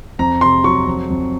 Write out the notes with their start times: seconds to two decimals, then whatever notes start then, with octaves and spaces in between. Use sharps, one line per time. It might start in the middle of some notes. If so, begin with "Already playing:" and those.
0.19 F2 A#5
0.41 C3 C6
0.64 F#3 C#6
0.87 F2
1.10 F2